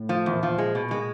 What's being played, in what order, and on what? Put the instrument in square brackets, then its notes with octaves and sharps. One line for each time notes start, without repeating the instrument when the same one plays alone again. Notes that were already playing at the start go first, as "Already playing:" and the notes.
Already playing: [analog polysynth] A2
[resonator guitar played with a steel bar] F3
[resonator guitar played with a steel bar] E2 [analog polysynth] A#2
[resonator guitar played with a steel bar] F3
G#3
B2
G#3